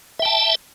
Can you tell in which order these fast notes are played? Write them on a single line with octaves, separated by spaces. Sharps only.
E5 G5 A5